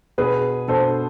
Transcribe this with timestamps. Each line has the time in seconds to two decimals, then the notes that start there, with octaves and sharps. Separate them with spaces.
0.18 B2 G#4 B4
0.68 B2 A4 C5